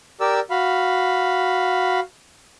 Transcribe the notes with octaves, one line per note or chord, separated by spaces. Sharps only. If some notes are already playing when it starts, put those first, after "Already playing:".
G4 A#4 D5 E6
F#4 F5 B5